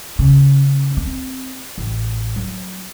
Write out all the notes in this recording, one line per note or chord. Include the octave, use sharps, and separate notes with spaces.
C#3
C4
A1
F#3